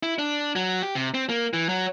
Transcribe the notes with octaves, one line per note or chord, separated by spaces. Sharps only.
E4
D4
F#3
G4
C3
C4
A#3
E3
F#3